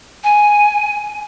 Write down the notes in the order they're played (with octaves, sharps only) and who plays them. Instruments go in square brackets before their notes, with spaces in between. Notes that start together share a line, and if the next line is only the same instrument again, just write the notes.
[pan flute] G#5